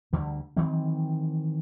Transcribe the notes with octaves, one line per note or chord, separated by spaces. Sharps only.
D2 D3 G3
D#3 E3 F#3 C4